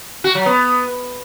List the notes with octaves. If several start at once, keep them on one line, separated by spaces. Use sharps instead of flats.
F#4
F#3
B3